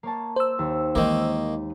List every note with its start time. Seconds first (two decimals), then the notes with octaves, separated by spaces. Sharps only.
0.03 A#3 C#5 A5
0.36 C5 E6
0.59 D#2
0.95 D#3 E3 G#3 A#3 C4